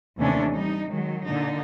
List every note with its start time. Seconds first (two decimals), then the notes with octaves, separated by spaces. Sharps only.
0.18 D#2 C3 E3 A3 C#4 D4
0.52 G3 D#4
0.89 D#3 F#3 G#3
1.25 A#2 D3 D#4